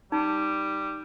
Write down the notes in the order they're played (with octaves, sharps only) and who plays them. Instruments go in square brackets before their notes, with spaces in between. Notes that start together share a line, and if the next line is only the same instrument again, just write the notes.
[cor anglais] G3 [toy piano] D#4